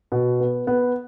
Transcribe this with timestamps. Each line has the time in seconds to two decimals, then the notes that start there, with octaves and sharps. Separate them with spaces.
0.12 B2
0.40 B3
0.67 B3